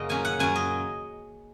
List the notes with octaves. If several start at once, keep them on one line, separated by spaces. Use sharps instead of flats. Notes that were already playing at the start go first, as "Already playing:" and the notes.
Already playing: F#2 C#3 A#3 F#4 D#5
A#2 F#3 C#4 G#5
F#5
F#2 F#3 C#4 G#5
D#5